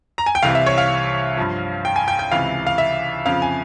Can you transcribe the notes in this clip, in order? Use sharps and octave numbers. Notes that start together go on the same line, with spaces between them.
A#5
G#5
G5
C2 C3 E3 F5
E5
C#5
F5
G2 F3
G5
G#5
G5
G5
C#2 C3 E3 F5
F5
E5
F2 C#3 F3 F5
G#5